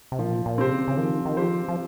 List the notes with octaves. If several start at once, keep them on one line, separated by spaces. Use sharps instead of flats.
C3
A#2 F3
A#2
C3 C4 G4 C5
C#3
C#3
D#3 F3
D#3
F3 C4 G4 C5
F3